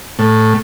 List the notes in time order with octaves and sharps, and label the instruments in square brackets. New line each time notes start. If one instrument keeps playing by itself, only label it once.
[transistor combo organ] A2